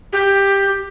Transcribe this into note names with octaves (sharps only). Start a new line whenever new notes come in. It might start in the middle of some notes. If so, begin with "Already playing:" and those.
G4